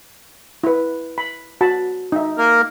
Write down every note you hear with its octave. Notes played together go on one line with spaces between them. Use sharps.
E4 B4
B5
F#4 A5 B5
D#4 E5
A#3 A#4